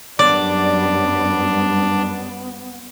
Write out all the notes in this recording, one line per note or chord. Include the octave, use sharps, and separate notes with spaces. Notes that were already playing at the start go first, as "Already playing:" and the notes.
F#2 G3 B3 D4 D5